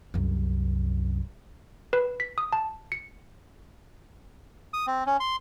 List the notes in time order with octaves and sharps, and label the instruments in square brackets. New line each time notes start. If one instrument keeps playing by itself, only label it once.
[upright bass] C2 F#2
[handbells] B4
B6
D#6
A5
C#7
[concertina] D#6
C4
C#4
C6